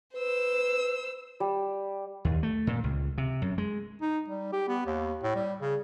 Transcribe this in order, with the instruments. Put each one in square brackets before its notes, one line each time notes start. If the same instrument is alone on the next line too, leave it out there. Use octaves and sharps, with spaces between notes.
[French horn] B4 [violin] C5 E6
[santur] G3
[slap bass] D#2
A3
A#2
C#2
C3
F#2
G#3
[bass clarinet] D#4
G3
G4
B3
D#2
A2
G3
C#3